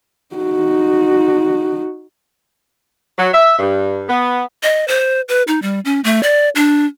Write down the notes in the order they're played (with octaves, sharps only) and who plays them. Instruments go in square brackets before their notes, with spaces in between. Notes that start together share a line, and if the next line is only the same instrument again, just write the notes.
[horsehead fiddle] D#4 F#4
[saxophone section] F#3
E5
G2
B3
[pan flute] D#5
C5
B4
D#4
G3
C#4
A3
D5
D4